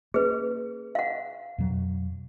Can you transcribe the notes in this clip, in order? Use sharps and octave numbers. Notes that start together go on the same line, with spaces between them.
A#3 C#4 G#4 B4
F5 F#5
F2 B2 F#3